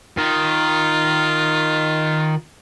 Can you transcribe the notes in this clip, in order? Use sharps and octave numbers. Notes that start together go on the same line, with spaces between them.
D#3 F4